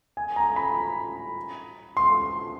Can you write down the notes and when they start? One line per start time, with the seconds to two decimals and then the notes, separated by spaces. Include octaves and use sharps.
0.17 G#5
0.36 A#5
0.56 B5
1.97 C6